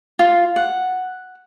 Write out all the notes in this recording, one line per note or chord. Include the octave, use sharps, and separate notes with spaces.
F4
F#5